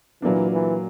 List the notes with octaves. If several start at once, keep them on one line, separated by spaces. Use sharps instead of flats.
A#2 E3 F#3 A#3 D4
E3